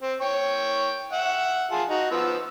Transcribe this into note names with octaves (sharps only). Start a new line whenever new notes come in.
C4
C#5 G5 C#6
E5 F#5
F4 G#4 A5
D#4 F#4
F3 B3 E6